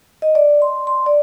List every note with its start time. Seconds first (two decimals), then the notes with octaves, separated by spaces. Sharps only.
0.22 D#5
0.35 D5
0.62 C6
0.87 C6
1.06 D5